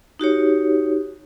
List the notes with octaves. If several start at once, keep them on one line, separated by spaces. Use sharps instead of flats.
D#4 F#4 G4 C#5